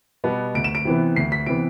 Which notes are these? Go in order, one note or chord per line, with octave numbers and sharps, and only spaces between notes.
B2 G3 B3
D2 D7
E7
D7
C3 E3 B3
D2 C7
B6
C3 E3 B3 D7